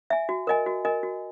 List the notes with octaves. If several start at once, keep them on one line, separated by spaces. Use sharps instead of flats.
E5 G#5
F#4
A#4 D#5 G#5
F#4
A#4 D#5 G#5
F#4